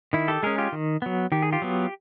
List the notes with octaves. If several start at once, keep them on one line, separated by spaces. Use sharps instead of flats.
D#3 E4
G4 A4
G#3 C#4 G#4 A#4
F4 G4
D#3
F#3 B3
D#3 G4
G#4
F4 G4
F#3 B3